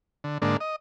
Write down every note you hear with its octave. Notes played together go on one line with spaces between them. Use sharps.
D3
G#2 D3 A#3 D4
D#5